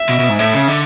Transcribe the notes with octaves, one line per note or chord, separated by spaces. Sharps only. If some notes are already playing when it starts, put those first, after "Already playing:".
Already playing: E5
B2
B2
G#2
A2 E5
C#3
D3